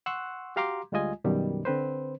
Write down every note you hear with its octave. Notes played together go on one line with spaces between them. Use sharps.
F#5 C6 C#6 E6 F#6
F#4 G4 F5 A#5 C6 D6
D2 G3 G#3 F4 D#5 G#5
F#2 B2 D#3 G3
D3 C4 B4 C5